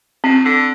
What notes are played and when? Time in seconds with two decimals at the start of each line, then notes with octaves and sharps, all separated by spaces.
0.24 F3 C4
0.46 D3